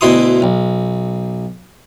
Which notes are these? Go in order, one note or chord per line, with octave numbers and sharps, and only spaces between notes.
D2 B2 E4 C6 D#6
B1